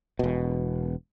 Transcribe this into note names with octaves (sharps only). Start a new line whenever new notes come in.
E1 B2